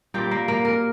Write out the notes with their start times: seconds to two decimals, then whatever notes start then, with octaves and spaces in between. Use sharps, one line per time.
0.14 A#2 G3 A#3 G4
0.31 A#3
0.48 A#3
0.65 A#4